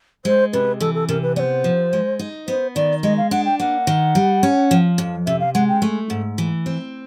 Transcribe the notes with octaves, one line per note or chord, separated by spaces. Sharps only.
G#3 C5
C3 B4
E3 A4
A4
C3 A#4
B4
B3 C5 D5
F3
G#3
D#4
B3 C5
D#3 D5
G#3 D#5
F5
D4 F#5
G5
A#3 F#5
D#3
G3
C#4
F3
F2
C3 E5
F5
G#3 F#5
G5
A3
G#2
E3
C4